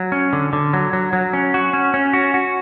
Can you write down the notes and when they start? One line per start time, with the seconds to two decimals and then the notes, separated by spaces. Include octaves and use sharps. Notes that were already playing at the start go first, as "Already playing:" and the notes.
Already playing: F#3
0.12 C#4
0.33 D3
0.53 D3
0.73 F#3
0.93 F#3
1.13 F#3
1.33 C#4
1.54 F#4
1.73 C#4
1.94 C#4
2.13 F#4
2.34 F#4